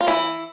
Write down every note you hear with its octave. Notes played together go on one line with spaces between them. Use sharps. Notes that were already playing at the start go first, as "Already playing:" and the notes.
F4
E3 E4